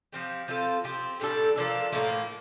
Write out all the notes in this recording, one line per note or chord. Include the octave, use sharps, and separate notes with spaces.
F3 C4 G4
F3 C4 F4 A4
F3 C4 G4
A2 G3 D4 A4
F3 A#3 D4 A4
A2 F3 A#3